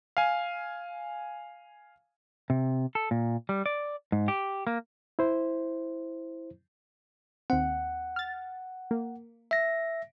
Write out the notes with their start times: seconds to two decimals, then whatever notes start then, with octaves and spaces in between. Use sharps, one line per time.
0.17 F5 G#5
2.50 C3
2.95 A4
3.11 A#2
3.49 G3
3.66 D5
4.12 G#2
4.28 G4
4.67 A#3
5.19 E4 C5
7.50 D#2 C4 F#5
8.16 F6 A6
8.91 A#3
9.51 E5 A#6